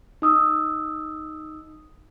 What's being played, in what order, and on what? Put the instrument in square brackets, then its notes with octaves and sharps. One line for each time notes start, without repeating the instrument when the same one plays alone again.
[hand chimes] D#4 D#6 E6